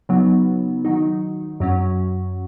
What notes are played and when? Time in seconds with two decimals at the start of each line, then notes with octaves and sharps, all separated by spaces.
0.09 C#3 F#3 B3 D#4
0.85 D#3 F#3 D#4
1.60 F#2 F#3 C#4